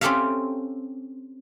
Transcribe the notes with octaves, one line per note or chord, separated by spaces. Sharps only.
C4 C#4 G4 A4 E5 F5